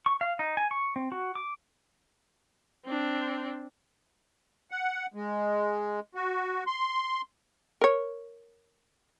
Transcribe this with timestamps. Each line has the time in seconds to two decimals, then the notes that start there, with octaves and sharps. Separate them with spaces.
0.06 C#6
0.21 F5
0.39 D#4
0.57 G#5
0.71 C#6
0.96 C4
1.12 F#4
1.35 D6
2.85 C4 D4
4.71 F#5
5.14 G#3
6.15 F#4
6.67 C6
7.81 A#4 C#5